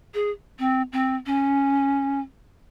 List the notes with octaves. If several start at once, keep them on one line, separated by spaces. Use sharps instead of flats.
G#4
C4
C4
C#4